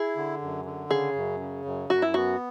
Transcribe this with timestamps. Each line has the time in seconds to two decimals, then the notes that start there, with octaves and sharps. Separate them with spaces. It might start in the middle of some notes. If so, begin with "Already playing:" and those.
Already playing: E4 G#4
0.17 D3
0.42 F#2
0.65 D3
0.90 C#3 G#4
1.16 F#2
1.40 C#3
1.65 F#2
1.90 F#2 F#4
2.02 E4
2.14 B3 F#4